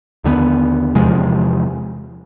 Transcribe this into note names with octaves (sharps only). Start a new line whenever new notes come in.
D#2 D3 F#3 B3
E2 C3 F3 G#3